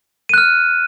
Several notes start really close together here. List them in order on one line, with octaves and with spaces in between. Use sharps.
D#7 F#6 F6